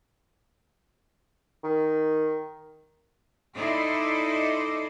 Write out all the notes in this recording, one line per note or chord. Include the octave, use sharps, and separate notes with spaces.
D#3
D#4 E4 A4 C5 D5 D#5